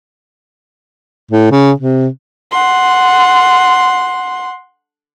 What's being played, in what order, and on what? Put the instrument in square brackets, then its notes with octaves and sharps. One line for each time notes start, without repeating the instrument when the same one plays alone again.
[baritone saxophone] A2
C#3
C3
[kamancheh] F#5 C6